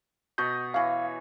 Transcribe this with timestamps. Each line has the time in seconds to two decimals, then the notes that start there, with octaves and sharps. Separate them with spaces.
0.38 B2 D#5 C#6 G6
0.74 E3 C#5 F5